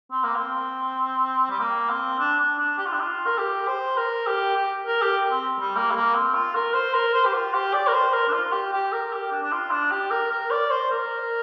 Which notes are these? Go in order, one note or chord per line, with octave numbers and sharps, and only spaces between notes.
C4
A#3
C4
G3
A#3
C4
D4
D4
D4
G4
F4
D4
F4
A#4
G4
C5
A#4
G4
G4
A#4
G4
C4
G3
A#3
G3
A#3
C4
F4
A#4
C5
A#4
C5
G4
F4
G4
D5
A#4
C5
A#4
D4
F4
G4
G4
A#4
G4
D4
D4
F4
D4
G4
A#4
A#4
D5
C5
A#4